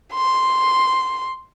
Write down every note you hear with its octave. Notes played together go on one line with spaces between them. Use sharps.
C6